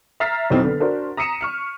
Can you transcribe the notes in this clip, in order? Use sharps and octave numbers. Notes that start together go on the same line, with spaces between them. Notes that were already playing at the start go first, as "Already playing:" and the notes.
E5 A#5 F6 A6 B6 C7
F2 B2 E3 F#3 C4 D#4
D3 B3
D4 F#4 A#4 C5
A#5 D#6 B6 C#7 D#7 E7
C#6 F6 C#7